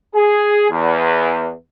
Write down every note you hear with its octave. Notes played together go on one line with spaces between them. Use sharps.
G#4
E2